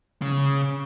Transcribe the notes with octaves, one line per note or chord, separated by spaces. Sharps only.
C#3